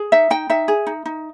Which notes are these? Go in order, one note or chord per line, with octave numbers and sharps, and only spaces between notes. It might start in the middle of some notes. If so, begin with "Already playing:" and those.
Already playing: G#4
D#4 E5
D#4 G5
D#4 E5
G#4
D#4
D#4